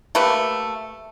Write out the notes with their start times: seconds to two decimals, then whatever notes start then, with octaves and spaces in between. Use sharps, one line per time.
0.15 A3 A#3 G4 B4